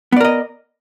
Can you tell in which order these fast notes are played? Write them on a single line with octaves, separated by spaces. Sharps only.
B3 D5 A#4 D#5